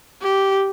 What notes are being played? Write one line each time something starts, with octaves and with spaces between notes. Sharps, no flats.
G4